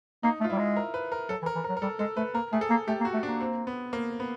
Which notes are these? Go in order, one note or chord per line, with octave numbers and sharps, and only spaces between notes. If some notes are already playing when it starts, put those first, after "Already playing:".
A#3 D#4
A3
F4
G3 E4
G#3
A#4
B4
A#4
F#3 A4
E3
A#4
E3
A#4
F#3
A#4
G3 A4
G#3 A4
A3 B4
A#3 A#4
A3 G#4
A4
A#3
A3 G4
A#3
F#4
A3
D4
A#3
C4
B3
A#3
B3